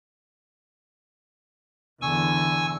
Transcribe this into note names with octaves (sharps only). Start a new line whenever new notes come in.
E2 D3 G#5 C#6 E6